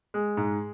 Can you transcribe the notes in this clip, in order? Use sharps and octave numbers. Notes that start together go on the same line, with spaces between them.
G#3
G#2